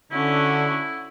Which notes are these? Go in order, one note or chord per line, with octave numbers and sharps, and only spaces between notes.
D3 C#4 D4 E4 F#4